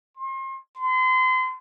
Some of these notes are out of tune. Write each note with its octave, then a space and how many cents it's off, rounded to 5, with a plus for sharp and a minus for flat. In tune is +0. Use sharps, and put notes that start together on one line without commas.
C6 +40
C6 -35